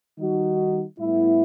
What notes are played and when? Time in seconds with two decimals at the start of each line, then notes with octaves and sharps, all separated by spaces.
0.18 D#3 G3 D#4 F#4
0.99 A2 G3 B3 E4